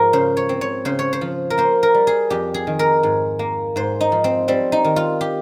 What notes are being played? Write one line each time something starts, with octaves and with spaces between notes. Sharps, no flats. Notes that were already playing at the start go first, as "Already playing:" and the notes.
Already playing: G#2 F3 G#4 A#4
C#3 C5
C#5
C4
C#5
C#3 C5
C#5
C5
F3
A#4
A#3 C5
A#4
G3
G#4
F2 G4
G#4
D#3
A#4
G#2
A#3
G#2 C5
D#4
F3
C4
G3 C4
D#4
D#3
F4
G4